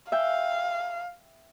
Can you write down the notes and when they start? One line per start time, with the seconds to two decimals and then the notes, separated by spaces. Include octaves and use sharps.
0.12 E5 F5 G5